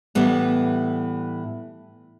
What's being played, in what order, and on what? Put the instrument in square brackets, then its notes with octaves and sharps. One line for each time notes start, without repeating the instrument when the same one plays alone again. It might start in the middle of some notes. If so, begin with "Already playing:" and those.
[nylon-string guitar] A2 E3 G3 B3